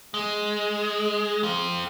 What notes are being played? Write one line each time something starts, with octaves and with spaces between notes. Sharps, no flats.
G#3
C4 F4